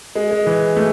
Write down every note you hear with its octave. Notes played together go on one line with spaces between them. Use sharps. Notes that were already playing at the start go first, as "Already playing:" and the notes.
G#3
G#3
E3
A3